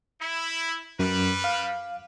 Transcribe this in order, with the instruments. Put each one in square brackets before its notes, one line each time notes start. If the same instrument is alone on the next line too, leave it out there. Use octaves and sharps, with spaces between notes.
[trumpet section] E4
[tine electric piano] F#2 [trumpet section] G3 B4
[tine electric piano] F5